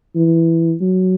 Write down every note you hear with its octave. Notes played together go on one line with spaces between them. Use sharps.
E3
F#3